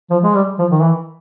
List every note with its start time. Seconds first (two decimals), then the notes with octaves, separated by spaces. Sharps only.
0.10 F3
0.23 G#3
0.34 G3
0.59 F3
0.71 D#3
0.83 E3